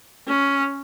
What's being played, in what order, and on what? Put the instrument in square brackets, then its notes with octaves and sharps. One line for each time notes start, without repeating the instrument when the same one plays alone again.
[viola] C#4